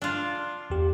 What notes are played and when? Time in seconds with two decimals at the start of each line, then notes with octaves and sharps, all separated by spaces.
0.02 D4 F4
0.70 E2 G4